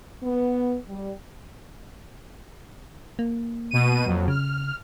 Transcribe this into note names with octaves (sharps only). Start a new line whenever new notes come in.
B3
G3
A#3
B2 D#7
F2 F#3
C#3 F6